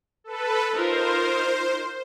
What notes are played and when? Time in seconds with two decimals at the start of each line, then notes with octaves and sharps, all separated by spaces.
0.24 A4 B4
0.73 D#4 F4 A#4 C5